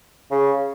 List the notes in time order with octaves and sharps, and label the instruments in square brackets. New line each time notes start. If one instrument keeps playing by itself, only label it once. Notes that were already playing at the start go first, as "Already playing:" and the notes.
[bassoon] C#3